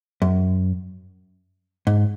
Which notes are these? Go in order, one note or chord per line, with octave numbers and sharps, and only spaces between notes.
F#2
G#2